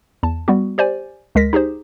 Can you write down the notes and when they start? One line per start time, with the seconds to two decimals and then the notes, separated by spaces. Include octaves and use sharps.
0.23 E2 A5
0.48 G3 B3 F#4
0.78 G4 C5 D5 G#5
1.35 D2 G#3 A#4 A#6 B6
1.53 D#4 G4 G#4 C5